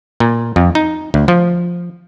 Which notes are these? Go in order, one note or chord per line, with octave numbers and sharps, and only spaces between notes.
A#2
F2
D#4
D2
F3